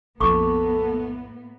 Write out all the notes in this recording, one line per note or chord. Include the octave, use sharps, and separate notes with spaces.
A#1 F2 A2 A#3 B3 A4 C#6 D6